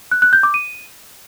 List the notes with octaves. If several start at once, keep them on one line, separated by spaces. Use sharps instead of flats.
F#6
F#6
G6
D6
D#7